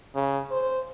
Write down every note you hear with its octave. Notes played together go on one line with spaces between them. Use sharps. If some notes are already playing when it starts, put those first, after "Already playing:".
C#3
C5